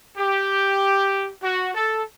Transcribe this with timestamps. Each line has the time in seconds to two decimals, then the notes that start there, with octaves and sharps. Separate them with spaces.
0.17 G4
1.42 F#4
1.73 A4